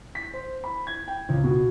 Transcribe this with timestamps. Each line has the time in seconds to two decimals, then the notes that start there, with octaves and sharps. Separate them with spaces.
0.15 B6
0.34 C5
0.64 B5
0.87 G#6
1.08 G5
1.29 C#2
1.44 B2